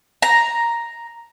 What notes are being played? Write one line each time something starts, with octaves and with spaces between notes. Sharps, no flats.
A#5